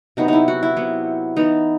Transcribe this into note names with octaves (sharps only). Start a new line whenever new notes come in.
C3 F#3 B3 D#4
D#4 E4
F#4
E4
C3 F#3 B3
E3 B3 D#4